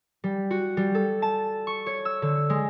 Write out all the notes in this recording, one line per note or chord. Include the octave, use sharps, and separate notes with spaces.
G3
F#4
G3
A4
A5
C#6
C#5
E6
D3
G#3